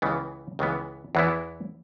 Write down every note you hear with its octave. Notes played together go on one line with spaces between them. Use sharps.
C#2 C#3 E3 B3
C#2 C#3 E3 B3
E2 E3 B3 E4